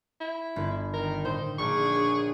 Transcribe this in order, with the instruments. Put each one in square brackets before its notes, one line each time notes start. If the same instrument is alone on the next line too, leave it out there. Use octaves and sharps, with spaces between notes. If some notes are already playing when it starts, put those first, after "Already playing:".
[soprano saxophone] E4
[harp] G1
[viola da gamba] D#3 [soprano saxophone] A#4
[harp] A2 D#4 [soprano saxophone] C5
[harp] A#1 D6 [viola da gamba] D4 G#4 [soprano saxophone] C#6
[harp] C#5